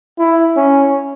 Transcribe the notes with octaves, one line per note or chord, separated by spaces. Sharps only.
E4
C#4